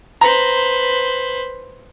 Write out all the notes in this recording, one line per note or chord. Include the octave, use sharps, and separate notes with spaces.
B4 C5 A#5